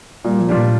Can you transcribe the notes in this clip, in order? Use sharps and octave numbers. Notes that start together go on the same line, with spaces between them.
A#2 G3
F3
G3 D4 F4
A#2